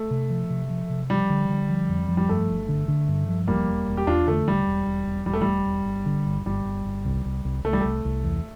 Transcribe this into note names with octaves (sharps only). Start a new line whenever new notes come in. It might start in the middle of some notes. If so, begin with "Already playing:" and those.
Already playing: A3
C3
F3
C3
F3
C3
F3 G3
D3
D3
F3
F2
F3
G3
G2 A3
G1
D3
D3
G2
F3
E1 G3 A#3
E1
E1
G4
E2 D4 F4
D3 A3
E1 G3
E1
E1
E1
E1 G3
A3
G3
E1
E1
G1
D3
G1
G1 G3
G1
G1
C2
C2
C2
C2 A3
G3
C2 A3
C2
E2